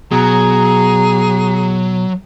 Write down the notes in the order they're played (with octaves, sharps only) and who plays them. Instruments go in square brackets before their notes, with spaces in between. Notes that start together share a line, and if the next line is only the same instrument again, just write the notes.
[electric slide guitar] B2 [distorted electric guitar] F#3 [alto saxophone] G#4 [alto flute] A#5